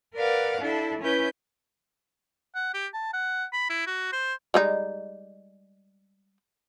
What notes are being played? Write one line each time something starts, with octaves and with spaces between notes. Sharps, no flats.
A#4 B4 D5 F5 F#5
D4 E4 A4
C#4 E4 B4 G6
F#5
G4
A5
F#5
B5
E4
F#4
C5
G3 G#3 D#4